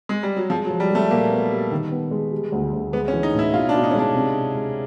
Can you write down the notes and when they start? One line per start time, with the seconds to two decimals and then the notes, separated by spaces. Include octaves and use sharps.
0.09 G#3
0.23 G3
0.36 F#3
0.50 F3 G#3
0.65 F#3
0.70 F3
0.80 G3
0.91 G#3 A3
1.11 A#2 A#3
1.31 B3
1.52 G3
1.71 D#3
1.91 B3
2.11 G#3
2.32 G3
2.52 D2
2.73 D2
2.93 G#3 B3
3.08 C#4
3.13 E3
3.23 D#4
3.33 A2
3.39 E4
3.53 B2 F4
3.69 D4
3.74 B2
3.84 D#4
3.91 C#4
3.94 G#3
3.99 D4
4.14 C3
4.34 C#4
4.55 G#3